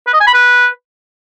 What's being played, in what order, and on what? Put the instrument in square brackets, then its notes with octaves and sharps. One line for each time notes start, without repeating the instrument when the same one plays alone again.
[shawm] B4
D#5
G#5
B5
B4